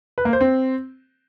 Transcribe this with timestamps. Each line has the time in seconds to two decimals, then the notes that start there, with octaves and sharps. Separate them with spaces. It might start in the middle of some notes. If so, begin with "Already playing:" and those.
0.18 B4
0.25 A#3
0.33 C5
0.41 C4